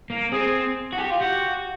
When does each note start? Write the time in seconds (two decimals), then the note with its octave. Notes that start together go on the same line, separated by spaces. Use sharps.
0.10 A#3
0.32 C4 G#4
0.93 F#4
0.98 G4
1.10 F4
1.21 F#4 G4